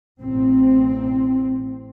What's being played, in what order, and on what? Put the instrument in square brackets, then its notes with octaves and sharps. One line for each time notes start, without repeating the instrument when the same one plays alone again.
[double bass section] A1 C4